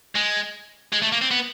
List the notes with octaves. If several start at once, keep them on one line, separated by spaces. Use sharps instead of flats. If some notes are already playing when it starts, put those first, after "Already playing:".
G#3
G#3
A3
A#3
C4
B3